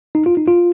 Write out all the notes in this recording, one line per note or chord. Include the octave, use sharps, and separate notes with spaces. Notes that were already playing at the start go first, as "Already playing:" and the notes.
D#4
F4
D#4
F4